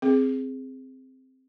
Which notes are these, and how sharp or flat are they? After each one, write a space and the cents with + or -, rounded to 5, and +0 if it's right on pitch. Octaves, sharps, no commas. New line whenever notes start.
C4 +0 G#4 +0